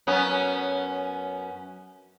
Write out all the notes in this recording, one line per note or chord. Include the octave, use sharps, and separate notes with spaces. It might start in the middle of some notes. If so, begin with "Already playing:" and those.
F#2 B3 C#4